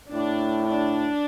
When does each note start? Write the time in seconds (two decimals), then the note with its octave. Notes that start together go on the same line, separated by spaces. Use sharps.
0.13 A2 D4
0.66 D4